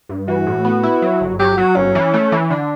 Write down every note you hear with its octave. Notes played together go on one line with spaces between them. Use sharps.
G2
E3 F#4
A2
B3
E4
F#3
G1
F#3 G4
F#3 F#4
G1 C#4
E3
A3
E3
D3 D4